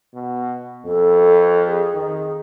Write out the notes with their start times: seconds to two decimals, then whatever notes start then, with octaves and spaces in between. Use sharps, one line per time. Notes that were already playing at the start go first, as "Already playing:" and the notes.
0.14 B2
0.86 F2 A4
1.66 G#4
1.94 D#3